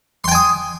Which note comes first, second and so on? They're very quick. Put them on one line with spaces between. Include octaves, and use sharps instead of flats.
C6 G5 G#5 D#6